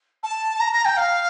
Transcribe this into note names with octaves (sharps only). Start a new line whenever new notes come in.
A5
A#5
A#5
G5
F5